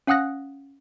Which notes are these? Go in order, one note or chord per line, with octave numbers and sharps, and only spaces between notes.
C#4 F5 F#5 D#6 F#6 A#6